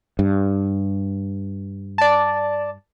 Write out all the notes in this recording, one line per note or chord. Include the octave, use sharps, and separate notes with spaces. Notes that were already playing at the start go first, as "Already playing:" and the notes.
G2
D5 A5